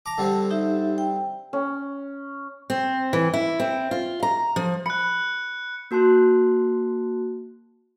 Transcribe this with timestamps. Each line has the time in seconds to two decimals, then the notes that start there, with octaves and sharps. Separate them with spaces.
0.06 A5 A#5 D6
0.18 D3 G3 C4
0.50 D#4 G4 E5
0.98 G5
1.53 C#4
2.70 C4
3.13 E3
3.34 E4
3.60 C4
3.91 F4
4.23 A#5
4.56 F3
4.86 B5 F#6 C#7
5.91 A#3 F#4 A5 C6 F#6